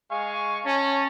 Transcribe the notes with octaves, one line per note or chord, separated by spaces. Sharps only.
G#3 F5 G#5 C#6
C#4 A5